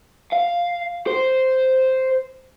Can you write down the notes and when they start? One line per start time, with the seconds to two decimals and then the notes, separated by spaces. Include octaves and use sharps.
0.33 F5
1.07 C5